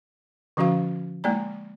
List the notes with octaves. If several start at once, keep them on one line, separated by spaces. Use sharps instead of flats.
D3 F3 C#4 F#4 F5
G#3 A#3 D5 A#5